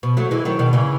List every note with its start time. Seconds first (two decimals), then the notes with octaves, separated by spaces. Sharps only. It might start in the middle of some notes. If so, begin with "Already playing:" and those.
0.03 B2
0.17 F#3 A3
0.31 E3 G#3
0.45 D#3 F#3
0.59 B2 D#3
0.73 C#3 E3